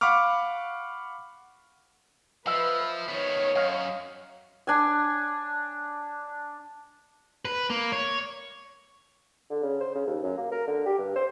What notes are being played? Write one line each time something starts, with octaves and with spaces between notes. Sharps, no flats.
F5 F#5 B5 C#6 D6 F6
F3 B4 D#5 E5
D#3 B3 C#5
F#2 D#5 F5
D4 G#5
B4
A#3
C#5
D3
C#3
C5
C#3
D#2
F#2
A#3
A#4
D3
G4
G2
C5